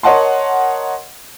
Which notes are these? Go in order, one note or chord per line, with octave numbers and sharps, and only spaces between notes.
A#4 C#5 D#5 F#5 A5 C6